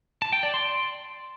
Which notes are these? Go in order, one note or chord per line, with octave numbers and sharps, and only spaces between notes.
A5
G5
D5
C6